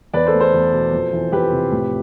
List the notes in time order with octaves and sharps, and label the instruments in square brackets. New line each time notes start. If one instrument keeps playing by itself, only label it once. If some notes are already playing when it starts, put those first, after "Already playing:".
[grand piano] E2 B4 D5
A4 C5
A3
A4 C5
E2
B2
F2
E3
F2 G4 B4
C3
A2